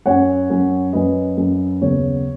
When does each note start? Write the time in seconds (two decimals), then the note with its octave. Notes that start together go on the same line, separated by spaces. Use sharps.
0.06 F#2 F#3 C#4 C#5 F#5
0.50 F#2 F#3 C#4
0.93 F#2 F#3 C#4 B4 D#5
1.37 F#2 F#3 C#4
1.81 D#2 C#3 F#3 B3 C#5